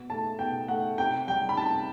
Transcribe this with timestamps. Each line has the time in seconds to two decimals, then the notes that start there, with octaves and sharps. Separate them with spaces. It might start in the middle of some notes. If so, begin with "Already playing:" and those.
Already playing: B2
0.10 A3 A5
0.39 B2 G5
0.68 A3 F#5
0.98 C3 G5
1.27 G3 G5
1.49 B5
1.57 C3 A5